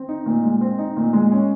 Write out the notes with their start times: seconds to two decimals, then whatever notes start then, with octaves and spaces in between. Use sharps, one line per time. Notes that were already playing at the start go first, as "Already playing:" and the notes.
Already playing: C4
0.09 D#4
0.26 A#2
0.43 G#3
0.61 C4
0.79 D#4
0.97 A#2
1.13 G#3
1.32 C#4